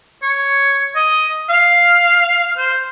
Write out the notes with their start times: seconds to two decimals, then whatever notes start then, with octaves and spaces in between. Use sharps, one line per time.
0.22 C#5
0.96 D#5
1.50 F5
2.58 C5